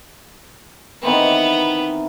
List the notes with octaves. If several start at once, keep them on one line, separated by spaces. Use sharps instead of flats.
D#3 E3 B3 C4